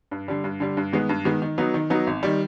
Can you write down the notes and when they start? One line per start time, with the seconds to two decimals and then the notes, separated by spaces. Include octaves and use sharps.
0.11 G2
0.28 D3 G3
0.44 G2
0.60 D3 G3
0.77 G2
0.93 D#3 G#3 B3
1.09 G2
1.25 D#3 G#3 B3
1.42 D#3
1.58 F#3 B3 D#4
1.74 D#3
1.90 F#3 B3 D#4
2.07 G#1
2.23 D#3 G3